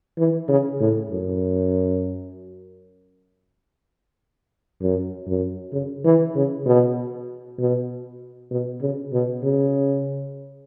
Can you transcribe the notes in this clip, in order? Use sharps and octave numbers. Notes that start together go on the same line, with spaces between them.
E3
C#3
A2
F#2
F#2
F#2
C#3
E3
C#3
B2
B2
B2
C#3
B2
C#3